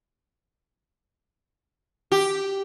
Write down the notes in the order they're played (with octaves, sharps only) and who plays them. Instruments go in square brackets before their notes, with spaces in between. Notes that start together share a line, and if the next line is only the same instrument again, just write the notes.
[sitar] G4